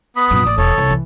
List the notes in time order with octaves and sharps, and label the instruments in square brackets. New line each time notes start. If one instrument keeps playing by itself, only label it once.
[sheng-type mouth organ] B3 B5 [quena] D#6
[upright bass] A#1 F#2
[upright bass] A1 [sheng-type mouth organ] D5
[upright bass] E1 [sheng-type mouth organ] A4 C#5
[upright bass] C2
E3